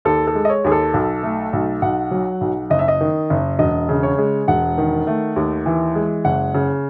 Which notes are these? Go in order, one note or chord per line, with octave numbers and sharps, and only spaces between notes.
D#2 A4
A4
G#3
D#5
C#5
D#2 G#4
A4
B1
A3
B1
B1 F#5
F#3
B1
F#1 D#5
E5
D#5
D#3
F#1
E1 D#5
C#3
C#5
G#3
E1 F#5
D#3
A3
D#2
E3
G#3
F#1 F#5
C#3